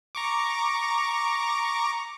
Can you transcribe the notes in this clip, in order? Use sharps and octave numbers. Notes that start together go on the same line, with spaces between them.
A#5 C#6 D6